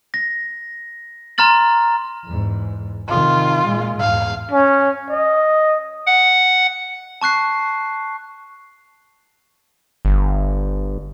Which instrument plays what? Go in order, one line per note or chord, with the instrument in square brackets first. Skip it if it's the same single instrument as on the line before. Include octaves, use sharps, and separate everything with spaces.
[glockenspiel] A#6
A#5 C6 F6 A6 F#7
[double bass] E2 G#2
[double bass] C3 D#3 [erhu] F4
[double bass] A#2 G#3
[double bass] E2 G#2 [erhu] F5
[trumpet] C#4
D#5
[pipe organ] F#5
[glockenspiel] A5 C#6 F#6 C7
[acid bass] G1